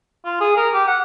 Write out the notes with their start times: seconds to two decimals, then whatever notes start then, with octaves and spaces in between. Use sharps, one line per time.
0.24 F4
0.41 G#4
0.56 A#4
0.73 G4
0.87 F#5